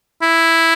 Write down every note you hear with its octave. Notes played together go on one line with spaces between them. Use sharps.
E4